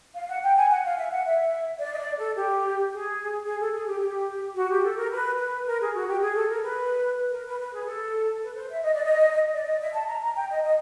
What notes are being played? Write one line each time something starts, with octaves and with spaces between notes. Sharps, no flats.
F5
F#5
G5
G#5
F#5
F5
E5
F#5
E5
D5
D#5
D5
A4
G4
G#4
G#4
A4
G#4
G4
G4
F#4
G4
A4
A#4
B4
B4
A#4
G#4
F#4
G4
G#4
A4
A#4
B4
A#4
B4
B4
G#4
A4
B4
C5
E5
D#5
D5
D#5
D5
D#5
E5
A5
A#5
A#5
G5
D#5
D#5